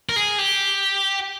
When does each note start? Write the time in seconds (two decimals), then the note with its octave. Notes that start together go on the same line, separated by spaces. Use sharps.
0.09 A#4
0.16 G#4
0.38 G4